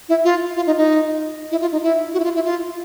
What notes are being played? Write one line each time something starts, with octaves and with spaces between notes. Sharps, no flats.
E4
F4
F4
D#4
D#4
E4
F4
D#4
E4
F#4
E4
F4
E4
F4